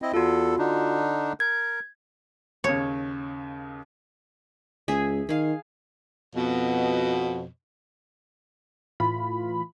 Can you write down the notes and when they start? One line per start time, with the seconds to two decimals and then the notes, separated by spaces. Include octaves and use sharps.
0.02 C4 E4 D#5
0.14 E2 F4 F#4 A4
0.59 D3 D4 D#4
1.40 A#4 G#6
2.64 D#2 C#3 C#5
4.88 C#2 G#4 E5
5.29 D#3 G#4 F5
6.34 F2 B2
9.00 A2 E3 F4 B5